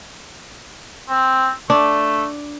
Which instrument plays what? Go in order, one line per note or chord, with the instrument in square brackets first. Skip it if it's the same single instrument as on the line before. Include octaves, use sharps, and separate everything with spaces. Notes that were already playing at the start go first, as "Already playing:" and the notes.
[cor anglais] C4
[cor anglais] A3 [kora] D4